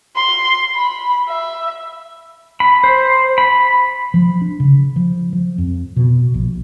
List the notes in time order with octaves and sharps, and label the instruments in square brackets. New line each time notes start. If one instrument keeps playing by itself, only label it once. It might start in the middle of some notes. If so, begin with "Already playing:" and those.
[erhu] C6
B5
E5
[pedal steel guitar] B5
C5
B5
[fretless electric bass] F3
D4
C#3
F3
F3
F2
B2
A#1